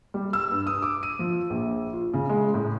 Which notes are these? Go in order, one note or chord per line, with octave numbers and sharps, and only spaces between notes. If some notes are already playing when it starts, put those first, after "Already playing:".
G3
E6
G2
D#6
D6
D#7
F3
A#1
F4
C#3
G#3
A2